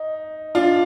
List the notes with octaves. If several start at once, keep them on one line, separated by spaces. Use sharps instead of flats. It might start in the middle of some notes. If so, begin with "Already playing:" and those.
Already playing: D#4
D4 F4